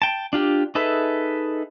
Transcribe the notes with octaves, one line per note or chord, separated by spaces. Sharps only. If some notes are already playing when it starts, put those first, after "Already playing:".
G5 A5
D4 F4 G4
D#4 G#4 A4 B4 E5